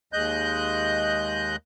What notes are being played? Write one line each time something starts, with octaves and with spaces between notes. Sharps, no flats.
D#2 G#3 D#5 F#6 G6